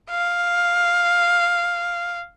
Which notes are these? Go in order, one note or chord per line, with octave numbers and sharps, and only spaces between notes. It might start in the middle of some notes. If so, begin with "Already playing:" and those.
F5